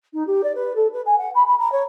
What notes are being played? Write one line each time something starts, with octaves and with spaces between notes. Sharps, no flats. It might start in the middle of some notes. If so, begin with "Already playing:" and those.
D#4
G4
D5
B4
A4
B4
G#5
F#5
B5
B5
A#5
C#5